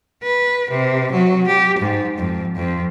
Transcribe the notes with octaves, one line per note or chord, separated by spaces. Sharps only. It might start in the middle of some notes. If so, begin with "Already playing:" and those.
B4
C3
F#3
G4
G#2
F2
F2